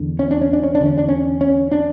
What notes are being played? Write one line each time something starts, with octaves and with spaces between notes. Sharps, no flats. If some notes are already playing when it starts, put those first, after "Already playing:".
Already playing: E2 D3
C#4
D4
C#4
D4
C#4
D4
E2 D3 C#4
D4
C#4
C#4
D4